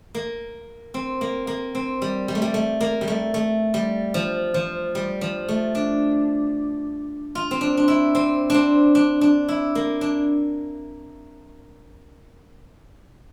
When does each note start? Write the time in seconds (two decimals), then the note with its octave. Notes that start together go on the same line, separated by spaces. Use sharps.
0.15 A#3
0.94 C4
1.21 A#3
1.47 A#3
1.75 C4
2.02 G3
2.28 G3
2.35 A3
2.42 G3
2.54 A3
2.81 A#3
3.01 G3
3.08 A3
3.34 A3
3.74 G3
4.14 F3
4.54 F3
4.95 G3
5.21 F3
5.49 A3
5.75 D4
7.35 F4
7.51 C4
7.61 D4
7.77 D4
7.88 E4
8.15 C4
8.50 C4 D4
8.95 D4
9.21 D4
9.49 E4
9.75 A#3
10.01 D4